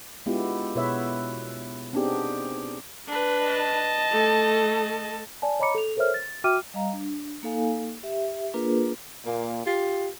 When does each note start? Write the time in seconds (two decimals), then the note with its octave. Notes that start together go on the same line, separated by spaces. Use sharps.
0.26 G#3 B3 D4 E4 F4 G4
0.75 B2 B3 E4 B4 C#5 E5
1.93 B3 C4 D4 D#4 G4 G#4
3.08 D4 B4
3.46 D#5 A5
4.10 A3 A4
5.42 D5 G#5 A5
5.59 C#5 D#5 A#5 B5 D6 C#7
5.75 A4 F7
5.96 A4 A#4 C5 C#5 E5 F6
6.14 A6
6.44 F#4 E5 G5 D6 F6 D#7
6.74 G3 D#5 F5 A#5
6.93 D4
7.43 A#3 D#4 A4 F5 G#5
8.03 G4 E5
8.54 A#3 D4 F4 G#4 A#4 B4
9.25 A#2 A#3
9.66 F4 G4